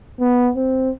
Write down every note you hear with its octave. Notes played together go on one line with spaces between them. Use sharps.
B3
C4